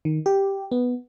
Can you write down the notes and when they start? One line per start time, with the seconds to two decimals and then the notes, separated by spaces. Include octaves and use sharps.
0.05 D#3
0.26 G4
0.71 B3